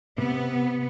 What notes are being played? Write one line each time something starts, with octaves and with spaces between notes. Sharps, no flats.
C3 B3